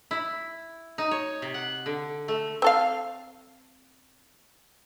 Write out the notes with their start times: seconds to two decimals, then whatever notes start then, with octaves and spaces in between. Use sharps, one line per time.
0.11 E4
0.98 D#4
1.11 C#5
1.42 C3
1.54 F#5
1.86 D3
2.28 A3
2.62 C4 A4 F5